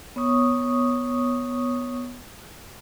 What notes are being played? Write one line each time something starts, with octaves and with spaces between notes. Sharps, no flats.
B3 C#5 C#6 D#6